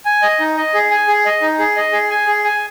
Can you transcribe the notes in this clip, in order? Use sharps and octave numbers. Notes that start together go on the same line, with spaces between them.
G#5
D#5
D#4
D#5
G#4
G#5
G#4
D#5
D#4
G#4
D#5
G#4
G#5
G#4
G#5